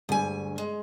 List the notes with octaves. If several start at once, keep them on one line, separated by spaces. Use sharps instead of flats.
D2 G2 D3 G#3 G#5
G#3